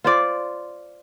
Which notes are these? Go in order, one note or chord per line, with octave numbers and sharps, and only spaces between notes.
F4 C5 D5